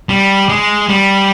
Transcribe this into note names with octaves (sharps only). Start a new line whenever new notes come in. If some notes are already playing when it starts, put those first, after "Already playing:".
G3
G#3
G3